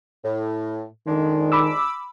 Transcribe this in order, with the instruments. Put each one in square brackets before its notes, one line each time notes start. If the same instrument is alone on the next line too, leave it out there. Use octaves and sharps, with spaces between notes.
[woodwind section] A2
[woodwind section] F2 G#3 D4 [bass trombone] D#3
[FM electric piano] B5 D6 E6